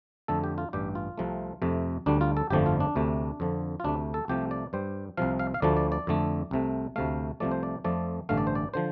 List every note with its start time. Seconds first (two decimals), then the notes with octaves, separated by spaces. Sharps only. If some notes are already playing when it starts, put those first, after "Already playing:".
0.28 F2 D3 A3 A4
0.44 G4
0.58 F4
0.73 A1 G2 G3 G4
0.95 F4
1.18 C2 C3 F3 A3
1.62 F2 C3 A3
2.06 D2 D3 G3 D4
2.21 F4
2.37 A4
2.50 G1 F2 D3 F3 A3 G4
2.66 F4
2.80 D4
2.96 D2 C3 A3
3.40 F2 D3 F3
3.80 F4
3.84 D2 C3 A3 D4
4.14 A4
4.28 C2 C3 F3 A3 G4
4.51 D5
4.73 G2 G3 C5
5.17 C2 C3 F3 F5
5.39 F5
5.54 F5
5.62 D2 D3 F3 A3 D5
5.77 D5
5.92 D5
6.07 F2 D3 A3
6.51 C2 C3 A3
6.96 D2 C3 A3 F5
7.40 C2 C3 F3 A3 D5
7.51 C5
7.63 D5
7.84 F2 F3 A3 D5
8.29 A1 G2 D3 A3 F5
8.38 D5
8.47 C5
8.55 D5
8.74 D3 F3 C5